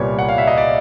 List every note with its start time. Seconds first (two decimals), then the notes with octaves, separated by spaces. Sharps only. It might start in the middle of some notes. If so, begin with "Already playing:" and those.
Already playing: C2 A#2 G3 B3 C#5
0.19 F#5
0.29 F5
0.38 E5
0.48 D#5
0.58 D5